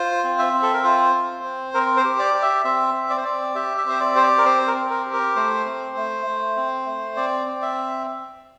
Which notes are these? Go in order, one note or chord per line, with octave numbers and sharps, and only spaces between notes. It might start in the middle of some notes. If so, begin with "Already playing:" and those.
Already playing: F4 C5
C4
E5
C4
A4
A#4
F4 C5
C4
C4
C4 A#4
C5
G4
D5
G4
E5
C4 E5
C4
D5
C5
C4 D5
G4 E5
E5
C4 C5
D5
G4 C5
D5
A#4
C4 C5
A#4
C4
A#4
G4
A#4
A3 C5
C4
A3
A3
C4
A3
C4 D5
C4
E5